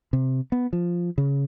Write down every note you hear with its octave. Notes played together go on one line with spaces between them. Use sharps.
C3
B3
F3
C#3